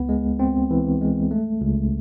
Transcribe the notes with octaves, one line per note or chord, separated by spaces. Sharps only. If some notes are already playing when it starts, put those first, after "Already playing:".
Already playing: C#2 B3
G#3
C4
E3
G#3
A3
C#2